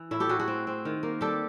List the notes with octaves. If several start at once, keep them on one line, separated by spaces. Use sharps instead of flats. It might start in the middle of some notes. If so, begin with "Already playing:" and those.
Already playing: E3
A2 E4
G4 A4
A2 F#4 G#4
F#4 G#4
C4
C4
D#3
A#3
G3 G4 A4